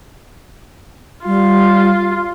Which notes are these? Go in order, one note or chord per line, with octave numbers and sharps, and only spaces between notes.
G3 F4